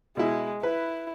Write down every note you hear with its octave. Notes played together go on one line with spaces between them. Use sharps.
B2 G#3 E4
E4 B4